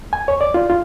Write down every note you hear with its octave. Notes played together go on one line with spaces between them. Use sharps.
G#5
C#5
D5
F4
F4